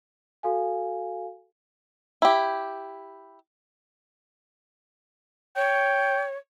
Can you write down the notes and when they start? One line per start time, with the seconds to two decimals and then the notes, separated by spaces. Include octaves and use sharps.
0.43 F#4 A4 F5 G#5
2.22 E4 G4
5.56 C#5 G5